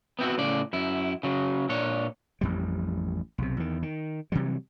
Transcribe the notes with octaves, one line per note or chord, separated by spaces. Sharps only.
B3 C4 E4 F#4
A2 C#3 D5
F#2 E4
C#3 F#3
A#2 D4 C#5
A1 F2 G3
B1 C3
E2 D#3
D#3
C3 E3 F#3 G3